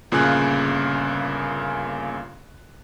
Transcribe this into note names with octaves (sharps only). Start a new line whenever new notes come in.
G1 A#2 C#3 F4 G#4 F#6